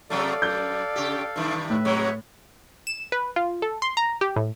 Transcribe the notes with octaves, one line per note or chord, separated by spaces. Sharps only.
C3 F#3 A3 A4 D5 F5
F#2 G6
C#3 G4
G2 C3 D#3
A2 B4 E5
C3 F#3 G#3 C#5
E7
B4
F4
A4
C6
A#5
G4
A2